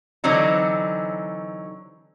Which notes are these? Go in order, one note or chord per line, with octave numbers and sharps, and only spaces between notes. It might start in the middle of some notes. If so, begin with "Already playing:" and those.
D3 E3 F#3 C4 D#4